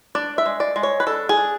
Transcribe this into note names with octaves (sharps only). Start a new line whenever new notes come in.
D4 D5
E5
G#3
D5
G#3
C#5
B4
D4 A4
G#4
D4